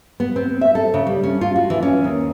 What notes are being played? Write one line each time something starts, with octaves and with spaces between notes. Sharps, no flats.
B3
C4
E5
A4
C#3
G3
C#4
F4
F#4
E3
C#4
D#2